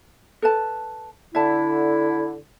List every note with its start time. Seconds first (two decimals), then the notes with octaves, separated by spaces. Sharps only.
0.42 A4 B4 A5
1.35 D3 E4 E5 A5